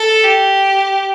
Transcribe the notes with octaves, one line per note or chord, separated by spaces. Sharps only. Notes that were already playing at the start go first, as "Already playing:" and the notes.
Already playing: A4
G4